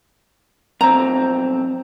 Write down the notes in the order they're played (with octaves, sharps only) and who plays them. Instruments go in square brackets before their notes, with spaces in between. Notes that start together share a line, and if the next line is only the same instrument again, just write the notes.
[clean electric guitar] B1 F2 C4 [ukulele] A#5